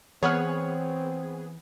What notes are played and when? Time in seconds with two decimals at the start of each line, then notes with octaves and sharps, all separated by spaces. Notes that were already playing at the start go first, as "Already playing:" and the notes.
0.23 E3 B3 C4 G#4 C#5 F#5 F6